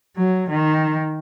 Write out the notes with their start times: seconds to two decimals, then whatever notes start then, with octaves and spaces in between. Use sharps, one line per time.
0.17 F#3
0.50 D#3